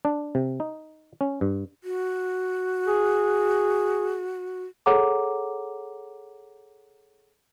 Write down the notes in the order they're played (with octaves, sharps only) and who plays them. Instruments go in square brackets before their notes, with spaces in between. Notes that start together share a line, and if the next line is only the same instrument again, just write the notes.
[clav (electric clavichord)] D4
C3
D#4
C#4
G2
[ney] F#4
[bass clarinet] G#4
[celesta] G#4 A4 C#5 F#5 A#5 D6